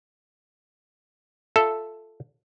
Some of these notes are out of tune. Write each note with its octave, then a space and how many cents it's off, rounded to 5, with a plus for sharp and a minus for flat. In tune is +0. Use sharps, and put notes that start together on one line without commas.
F4 +0 A4 +0 E5 +0